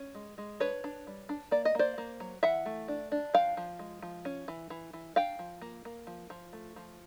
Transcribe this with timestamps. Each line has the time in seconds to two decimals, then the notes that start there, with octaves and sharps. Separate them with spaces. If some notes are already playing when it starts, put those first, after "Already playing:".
Already playing: C#4
0.15 G#3
0.38 G#3
0.60 D4 B4 C#5
0.84 D4
1.07 G3
1.29 D4
1.51 A#3 D5
1.65 D#5
1.75 A#3 C5 D5
1.98 A#3
2.20 F#3
2.43 E3 E5 F#5
2.66 A3
2.88 D4
3.12 D4
3.34 F3 F5 G5
3.57 F3
3.79 G#3
4.02 F3
4.25 C#4
4.48 E3
4.70 E3
4.93 E3
5.16 D4 F5 G5
5.39 F3
5.62 A#3
5.85 A#3
6.07 F3
6.30 F3
6.53 A3
6.76 F3